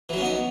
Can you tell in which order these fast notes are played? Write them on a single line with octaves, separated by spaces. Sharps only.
E3 F#3 C#4 B3 D#4